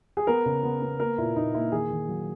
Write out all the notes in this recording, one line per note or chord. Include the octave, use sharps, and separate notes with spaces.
G#4
B3 A#4
C#3
B3
B3
A#3 A#4
A#2 E4
A#2 D#4
A#3 E4
D#3 G#4
D#3
F#3